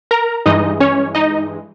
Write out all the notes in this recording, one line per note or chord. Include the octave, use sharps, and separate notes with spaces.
A#4 A#5
G2 E3 G#3 D#4 D#5
C#4 C#5
D#4 D#5